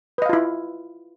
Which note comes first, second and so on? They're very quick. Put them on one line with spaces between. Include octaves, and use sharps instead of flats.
B4 D#5 F5 F4 E4